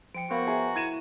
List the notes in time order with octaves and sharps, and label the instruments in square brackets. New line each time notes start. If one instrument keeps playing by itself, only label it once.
[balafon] F3 G5 [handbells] C#7 D7
[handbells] B3 C5 C6 [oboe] F#4 [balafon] A#4 F5 B5
[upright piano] G#4 [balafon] E5 [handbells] A#5
[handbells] E4 [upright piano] G#6 D#7 E7